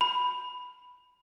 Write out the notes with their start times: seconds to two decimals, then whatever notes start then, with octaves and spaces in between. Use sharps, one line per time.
0.01 B5